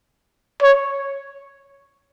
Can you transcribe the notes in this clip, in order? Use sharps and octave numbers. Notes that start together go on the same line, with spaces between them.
C#5